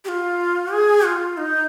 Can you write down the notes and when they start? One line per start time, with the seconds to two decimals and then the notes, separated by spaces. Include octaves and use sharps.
0.04 G4
0.08 F4
0.72 G#4
1.05 F4
1.37 D#4